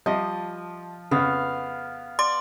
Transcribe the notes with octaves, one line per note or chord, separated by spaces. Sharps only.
F3 G3 D#5 E5
F2 C#3 B3 F5
D5 C6